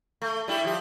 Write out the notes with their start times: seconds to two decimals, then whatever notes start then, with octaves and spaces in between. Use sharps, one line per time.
0.22 A3
0.48 G3 E4 G4
0.64 F3 G4